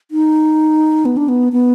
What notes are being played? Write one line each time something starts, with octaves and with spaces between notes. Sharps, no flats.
D#4
B3
D4
B3
B3